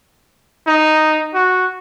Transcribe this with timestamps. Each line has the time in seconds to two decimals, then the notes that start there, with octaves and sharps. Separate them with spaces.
0.67 D#4
1.34 F#4